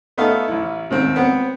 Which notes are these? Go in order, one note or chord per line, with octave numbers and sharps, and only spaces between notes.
A3 B3 D#4 A4 E5 F5
A1 E4
D#2 G#2 C4
B3 C4 F#5